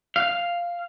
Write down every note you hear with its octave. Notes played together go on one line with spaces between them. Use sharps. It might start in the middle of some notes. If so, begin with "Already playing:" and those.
F5